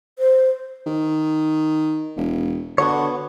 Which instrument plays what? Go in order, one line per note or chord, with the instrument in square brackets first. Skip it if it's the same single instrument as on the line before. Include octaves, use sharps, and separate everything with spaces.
[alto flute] C5
[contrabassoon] D#3
E1
[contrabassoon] D3 [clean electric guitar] B3 F#4 C#5